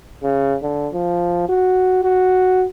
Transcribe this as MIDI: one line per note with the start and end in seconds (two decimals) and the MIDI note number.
0.23 0.56 49
0.63 0.88 50
0.94 1.44 53
1.49 2.02 66
2.04 2.66 66